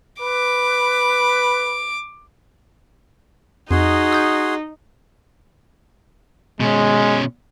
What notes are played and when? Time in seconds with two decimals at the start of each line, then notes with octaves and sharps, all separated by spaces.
0.22 B4 D6
3.71 F2 D#4 F#4 G#4 C6
4.12 D#6 G6
6.60 B2 G#3 C#4